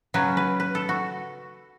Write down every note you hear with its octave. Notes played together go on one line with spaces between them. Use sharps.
C#3 F#3 C#4 B4
B4
B4
A4
F#4